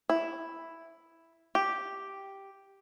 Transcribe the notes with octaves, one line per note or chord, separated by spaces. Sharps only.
E4
G4